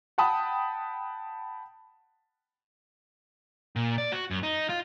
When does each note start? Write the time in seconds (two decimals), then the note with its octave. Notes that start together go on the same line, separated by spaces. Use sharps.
0.18 F#5 G5 A5 B5 D#6
3.76 A#2
3.98 D5
4.12 F#4
4.31 F#2
4.43 D#4
4.69 F4